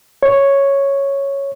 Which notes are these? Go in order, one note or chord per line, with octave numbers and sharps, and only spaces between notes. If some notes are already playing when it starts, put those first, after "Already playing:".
C#5